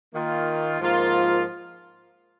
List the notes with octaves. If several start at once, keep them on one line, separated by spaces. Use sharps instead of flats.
D#3 A#3 F4
G#2 F3 A#3 F4 A#4